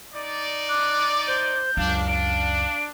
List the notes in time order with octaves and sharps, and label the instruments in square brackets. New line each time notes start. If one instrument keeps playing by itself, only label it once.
[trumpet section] D#4 D5
[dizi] D6 [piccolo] F#6
[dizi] C5 [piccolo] G6
[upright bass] C#2 F#2 [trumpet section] D4 [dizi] F5
[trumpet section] D4 [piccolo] D7